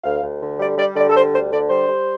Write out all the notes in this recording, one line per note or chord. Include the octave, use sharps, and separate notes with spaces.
D2 F5
D2
D3
G3 D5
G3 D5
D3 D5
A4
G3 C5
D2 C5
D3 D5
G3 C5
G3